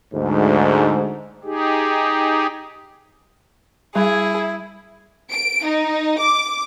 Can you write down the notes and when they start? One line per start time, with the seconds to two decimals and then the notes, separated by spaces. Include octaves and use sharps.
0.14 D2 G#2
1.44 D#4 G4 G#4
3.96 G3 E4 G#4
5.31 D7
5.64 D#4
6.19 D6